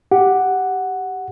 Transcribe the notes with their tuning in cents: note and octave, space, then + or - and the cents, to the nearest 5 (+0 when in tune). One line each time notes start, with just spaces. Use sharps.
G4 +0 F#5 +0